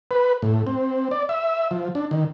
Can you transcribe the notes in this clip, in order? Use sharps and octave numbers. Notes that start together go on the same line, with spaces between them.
B4
A2
C4
D5
E5
F3
D4
D#3